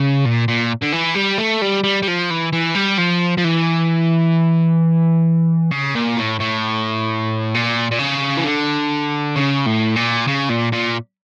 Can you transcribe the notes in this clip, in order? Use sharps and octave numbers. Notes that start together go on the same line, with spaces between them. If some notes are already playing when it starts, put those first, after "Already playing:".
Already playing: C#3
A#2
A#2
D3
E3
G3
A3
G3
G3
G3
F3
E3
E3
G3
F3
F3
E3
C#3
A#2
A2
A2
A#2
A#2
C#3
E3
D3
C#3
A2
A#2
C#3
A#2
A#2